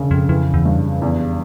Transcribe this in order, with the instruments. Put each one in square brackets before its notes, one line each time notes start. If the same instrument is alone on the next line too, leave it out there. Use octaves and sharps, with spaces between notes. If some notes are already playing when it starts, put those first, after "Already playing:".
Already playing: [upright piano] E1 C#3
[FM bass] F2
[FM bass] F2 [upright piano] E3
[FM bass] E2
[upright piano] G2
[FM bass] F2
[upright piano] E2